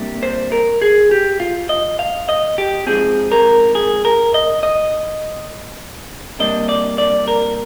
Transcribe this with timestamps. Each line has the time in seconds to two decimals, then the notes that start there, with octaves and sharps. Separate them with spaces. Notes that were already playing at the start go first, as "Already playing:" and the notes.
Already playing: C3 G3 A#3 D4
0.23 C5
0.52 A#4
0.82 G#4
1.11 G4
1.40 F4
1.69 D#5
1.99 F5
2.29 D#5
2.58 G4
2.87 G#2 F3 C4 G#4
3.32 A#4
3.75 G#4
4.05 A#4
4.34 D#5
4.63 D#5
6.39 C3 G3 A#3 D4 D#5
6.69 D5
6.98 D5
7.28 A#4